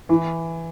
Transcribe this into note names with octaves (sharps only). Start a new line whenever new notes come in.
E3 E4